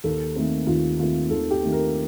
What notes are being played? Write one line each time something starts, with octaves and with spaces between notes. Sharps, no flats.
D#2 A4
D#3 A3 C4
D#2 F4
D#3 A3 C4 F4
D#2 A4
G4
D#3 A3 C4
A#4